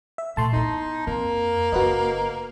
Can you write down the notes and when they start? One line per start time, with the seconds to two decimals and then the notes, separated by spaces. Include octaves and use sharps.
0.18 E5
0.37 A#2 A3 A5 C6
0.52 B3 D#4 E4
1.07 F2 A#3
1.72 F#1 F4 F#4 B4 D#5